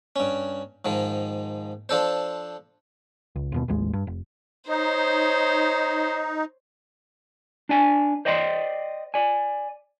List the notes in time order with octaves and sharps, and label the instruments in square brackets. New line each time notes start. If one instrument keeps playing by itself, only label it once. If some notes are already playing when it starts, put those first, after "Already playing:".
[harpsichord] G2 C#4
G#2 D#3 F3
F3 D4 A4 C5
[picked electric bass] C#2
D#1 D#2 B2
A1 D#2 G#3
G2
F1
[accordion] D#4 [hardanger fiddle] C5 C#5
[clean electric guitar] D4 D5 G#5
C5 D5 D#5 G5 B5 C6
D5 G#5